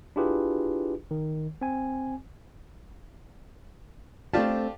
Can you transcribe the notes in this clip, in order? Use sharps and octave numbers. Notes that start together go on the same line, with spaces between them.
D4 E4 F4 G4 G#4 B4
D#3
C4 G#5
A3 C4 D4 F4 G4 A5